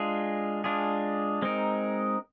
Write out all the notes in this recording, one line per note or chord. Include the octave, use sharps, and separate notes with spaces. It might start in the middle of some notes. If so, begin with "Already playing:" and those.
Already playing: G#3 D4 F4 G#4
G#3 D4 F4 G#4
G#3 C4 D#4 A#4